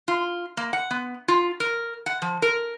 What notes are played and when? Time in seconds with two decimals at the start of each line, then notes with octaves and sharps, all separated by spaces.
0.08 F4
0.57 A#3
0.73 F#5
0.91 B3
1.28 F4
1.60 A#4
2.06 F#5
2.22 F3
2.42 A#4